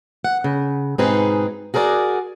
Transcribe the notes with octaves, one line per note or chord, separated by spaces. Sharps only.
F#5
C#3
G#2 B2 C4 D#4 G#4 B4
F#4 G#4 A#4 B4 D5